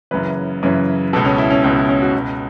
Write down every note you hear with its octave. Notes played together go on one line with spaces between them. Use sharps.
F#1 F#2 C#3 E3 B4
F#1 F#2 C#3 E3
C#2 B2 A4
C#4
E4
C#4
C#2 B2 C#4
E4
C#4
F#4
C#2 B2